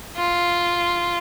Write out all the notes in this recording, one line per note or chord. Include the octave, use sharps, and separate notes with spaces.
F4